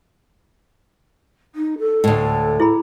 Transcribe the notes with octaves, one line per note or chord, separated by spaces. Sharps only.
D#4
A4
D2 A2
E4 G#4 B5